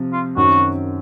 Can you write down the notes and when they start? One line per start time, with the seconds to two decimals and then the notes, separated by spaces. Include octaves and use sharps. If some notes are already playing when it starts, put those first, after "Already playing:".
Already playing: C3 F3 C4
0.13 F4
0.36 F#2 D#3 F#3 C4 F#4